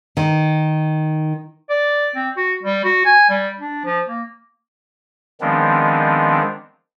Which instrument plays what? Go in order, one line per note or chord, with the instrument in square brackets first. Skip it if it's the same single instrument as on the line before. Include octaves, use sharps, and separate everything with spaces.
[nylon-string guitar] D#3
[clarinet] D5
C4
F#4
G3
F#4
G#5
G3
D4
F3
A#3
[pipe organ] D#3 F3 G#3 B3 C4 D4